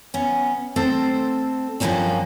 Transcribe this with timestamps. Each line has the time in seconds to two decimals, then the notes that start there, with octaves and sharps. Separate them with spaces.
0.14 B3 C#4
0.76 A3 C4 A4 C5
1.80 G2 F3 G#3 A#3 C#4 F#4